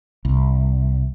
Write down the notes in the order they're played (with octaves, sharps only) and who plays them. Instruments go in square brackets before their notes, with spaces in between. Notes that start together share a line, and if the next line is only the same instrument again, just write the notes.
[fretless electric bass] C2